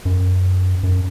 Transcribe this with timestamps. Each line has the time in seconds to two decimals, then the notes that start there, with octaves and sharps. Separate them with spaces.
0.05 F#2
0.83 F#2